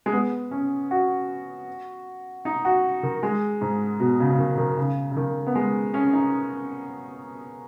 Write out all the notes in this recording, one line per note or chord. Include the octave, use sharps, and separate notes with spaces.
G#3
B3
C#4
F#4
D#4
F#4
D#3
G#3
G#2
B2
C#3
C#3
D#3
D#3
C#3
C#3
D#3
B3
G#3
C#4
D#4